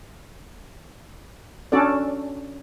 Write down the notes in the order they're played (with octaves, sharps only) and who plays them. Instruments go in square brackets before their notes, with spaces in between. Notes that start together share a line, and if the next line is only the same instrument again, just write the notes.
[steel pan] C#4 D4 F#4 A4 D5